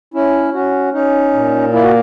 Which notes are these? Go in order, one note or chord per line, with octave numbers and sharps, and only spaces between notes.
C#4 E4
C#4 F#4
C#4 D#4
A#2
A#3 E4
F#4